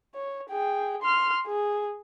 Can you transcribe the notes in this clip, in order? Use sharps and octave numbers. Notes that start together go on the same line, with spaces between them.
C#5
G#4 G5
C6 F6
G#4